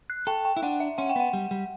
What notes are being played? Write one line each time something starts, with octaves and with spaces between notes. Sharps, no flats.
F#6
A4 G5
G5
E4
D4 F#5
E5
C#4 F#5
G5
B3 F#5
G3
G3